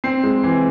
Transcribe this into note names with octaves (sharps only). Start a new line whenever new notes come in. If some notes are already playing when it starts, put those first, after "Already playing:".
C4 C7
G#3
E3